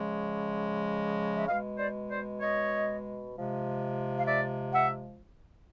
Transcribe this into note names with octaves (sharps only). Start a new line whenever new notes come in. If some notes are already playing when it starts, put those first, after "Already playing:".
Already playing: C#3 F3 G#3
E5
B2 G#3 D#5 F5
C5 D5
C5 D5
C#5 D#5
C3 F3 G#3
F5
D5 E5
E5 F#5